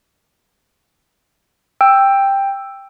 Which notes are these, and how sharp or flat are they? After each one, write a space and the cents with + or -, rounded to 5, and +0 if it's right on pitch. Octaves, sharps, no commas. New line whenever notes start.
G5 +10 E6 +5